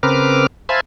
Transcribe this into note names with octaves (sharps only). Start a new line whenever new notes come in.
C#3 C4 A#4 B4 D6 F6
C5 E5 F5 G#5 A5 B5